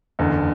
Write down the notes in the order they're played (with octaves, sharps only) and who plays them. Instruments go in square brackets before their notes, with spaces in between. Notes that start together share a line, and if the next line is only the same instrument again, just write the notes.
[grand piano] F#1 E2 D3